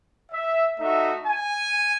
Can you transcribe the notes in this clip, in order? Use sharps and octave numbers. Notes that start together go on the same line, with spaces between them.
E5
A3 D#4 F#4 E5
G#5